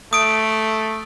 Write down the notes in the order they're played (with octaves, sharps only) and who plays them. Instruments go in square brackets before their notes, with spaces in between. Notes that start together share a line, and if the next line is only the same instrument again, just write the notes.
[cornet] A3 [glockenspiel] D#6 D7